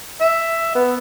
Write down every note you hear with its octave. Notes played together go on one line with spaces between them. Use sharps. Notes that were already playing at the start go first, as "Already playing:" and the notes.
E5
B3